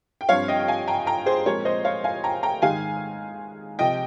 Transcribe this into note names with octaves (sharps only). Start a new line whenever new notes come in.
G5
G2 F3 C4 C#5 F5
D#5 G5
G5
F5 G#5
G5 A#5
G5 A#5
G#4 C5
A#2 F3 G#3 C4 A#4 C#5
C5 D#5
C#5 F5
F5 G#5
G5 A#5
G5 A#5
G#2 D#3 G#3 D#4 F5 G#5
C3 F3 D#5 G5